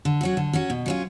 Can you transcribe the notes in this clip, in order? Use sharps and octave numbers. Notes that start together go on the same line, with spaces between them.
D3
F#3 C#4 F#4
D3
F#3 C#4 F#4
B2
F#3 C#4 F4